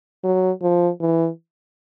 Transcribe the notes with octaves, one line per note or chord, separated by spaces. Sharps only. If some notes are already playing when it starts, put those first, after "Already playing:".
F#3
F3
E3